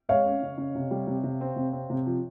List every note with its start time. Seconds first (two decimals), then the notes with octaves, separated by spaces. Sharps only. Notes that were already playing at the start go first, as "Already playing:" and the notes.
0.09 G#3 C#5 F5
0.25 C#4
0.42 C#3
0.57 C#3
0.75 C3
0.91 G3
1.07 C3
1.23 C3
1.41 C4
1.56 C3
1.73 C4
1.90 C3
2.06 F3